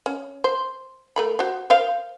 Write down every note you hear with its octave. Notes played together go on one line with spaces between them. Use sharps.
C#4
C5
A3 A#4 B5
F#4 C5
A#4 C5 F5